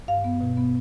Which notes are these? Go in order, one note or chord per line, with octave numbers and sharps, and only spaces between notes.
G2 F5
B3
B2
B3